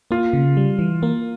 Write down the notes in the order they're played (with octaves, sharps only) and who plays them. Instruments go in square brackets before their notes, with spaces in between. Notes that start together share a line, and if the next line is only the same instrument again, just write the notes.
[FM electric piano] A#3 [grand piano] F4
[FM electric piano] C#3
G3
E3
A#3